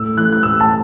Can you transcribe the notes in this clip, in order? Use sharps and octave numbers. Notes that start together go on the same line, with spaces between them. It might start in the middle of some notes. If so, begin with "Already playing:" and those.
Already playing: A2 E6
E3 A3 F#6
F#6
A2 E6
A5